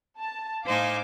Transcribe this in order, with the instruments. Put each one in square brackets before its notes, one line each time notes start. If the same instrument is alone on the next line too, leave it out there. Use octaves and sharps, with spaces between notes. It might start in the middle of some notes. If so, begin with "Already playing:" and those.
[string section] A5
[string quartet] A2 D#4 G#5 [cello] C5 [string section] F5 D6